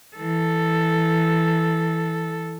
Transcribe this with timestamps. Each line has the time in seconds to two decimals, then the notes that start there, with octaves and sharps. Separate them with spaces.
0.17 E3 A4